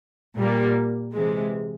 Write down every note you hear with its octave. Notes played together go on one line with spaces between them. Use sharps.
A#2 G3 A#3
C3 E3 G#3